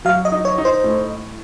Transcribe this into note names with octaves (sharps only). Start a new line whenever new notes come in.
F#3 F5
D#5
D#4
C#5
D#4
C5
A2